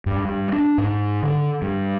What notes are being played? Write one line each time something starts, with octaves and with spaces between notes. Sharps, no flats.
G2
G2
D4
G#2
D3
G2